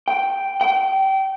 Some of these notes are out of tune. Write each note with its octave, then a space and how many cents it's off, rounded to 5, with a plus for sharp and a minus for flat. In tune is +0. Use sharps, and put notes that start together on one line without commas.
G5 +0
G5 -25